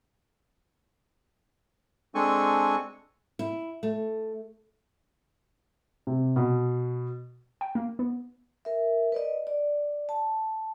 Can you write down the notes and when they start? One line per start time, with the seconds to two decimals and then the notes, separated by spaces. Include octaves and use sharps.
2.15 G#3 C4 D4 A4 G#5 C#6
3.39 E4
3.83 A3
6.07 C3
6.36 B2
7.61 G5
7.75 A#3
7.99 B3
8.65 A#4 E5
9.12 B4 D5 D#5
9.47 D5
10.09 A5